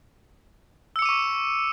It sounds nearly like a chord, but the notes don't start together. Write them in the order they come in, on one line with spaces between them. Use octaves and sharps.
E6 C#7 D6 D#7 C#6